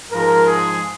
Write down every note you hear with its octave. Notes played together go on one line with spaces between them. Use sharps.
G#2 F3 G#3 A#4
G#4